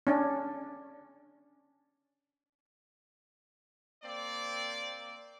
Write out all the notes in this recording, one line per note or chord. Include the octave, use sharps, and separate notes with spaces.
C#4 D4
A#3 C4 D5